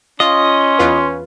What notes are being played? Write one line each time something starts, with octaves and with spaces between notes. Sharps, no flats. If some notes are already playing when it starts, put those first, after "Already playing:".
C#4 F4 D#5 C6
E2 F4 B4